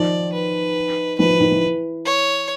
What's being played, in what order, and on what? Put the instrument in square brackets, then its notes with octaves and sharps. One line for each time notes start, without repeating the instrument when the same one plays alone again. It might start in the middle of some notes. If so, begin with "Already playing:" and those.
Already playing: [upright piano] D#3 F3 [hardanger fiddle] D5
[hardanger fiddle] B4
[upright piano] D#3 F3 [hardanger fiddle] B4
[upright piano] E3
D#3
E3
[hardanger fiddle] C#5